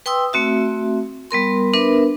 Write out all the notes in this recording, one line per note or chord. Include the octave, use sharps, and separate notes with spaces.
B4 G5 C6 D#6 E6
A3 C4 F#4 E5
G3 B3 A#4 C6
B3 D4 A#4 B4 E5